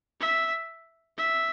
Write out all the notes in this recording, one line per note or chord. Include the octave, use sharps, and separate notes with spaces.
E5
E5